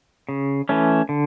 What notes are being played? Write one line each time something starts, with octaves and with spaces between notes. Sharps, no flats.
C#3
E3 A3 C#4
D3